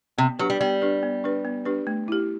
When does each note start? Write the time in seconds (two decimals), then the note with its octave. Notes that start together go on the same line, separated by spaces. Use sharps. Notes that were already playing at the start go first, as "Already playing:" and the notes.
0.18 C3 B3
0.39 F#3 D4 G4 B4
0.50 G3
0.60 G3 B3
0.81 D4 G4 B4
1.03 B3
1.24 D4 G4 B4
1.45 B3
1.65 D4 G4 B4
1.87 A3
2.08 E4 G4